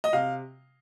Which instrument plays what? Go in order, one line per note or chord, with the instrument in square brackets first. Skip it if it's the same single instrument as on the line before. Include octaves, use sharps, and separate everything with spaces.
[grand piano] D#5
C3 F5